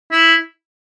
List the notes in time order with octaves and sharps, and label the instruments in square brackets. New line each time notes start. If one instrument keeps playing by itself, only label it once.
[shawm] E4